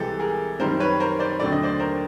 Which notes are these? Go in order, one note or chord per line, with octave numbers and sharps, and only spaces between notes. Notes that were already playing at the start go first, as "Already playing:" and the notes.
Already playing: C2 C3 E3 G#3 G4 A4
G#4 A#4
F#2 D#3 G3 A#4 C5
B4 C#5
A#4 C5
C5 D5
D#2 D3 F#3 A3 D5
D#5
C5 D5
A#4 C5